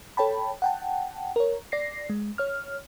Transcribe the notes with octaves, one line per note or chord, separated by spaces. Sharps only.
A4 C#5 G5 A5 B5
F#5 G5 A5
A#4 C#5
D5 A#6 C7
G#3
C#5 F6